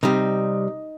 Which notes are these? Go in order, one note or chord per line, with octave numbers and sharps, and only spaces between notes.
C3 G3 D#4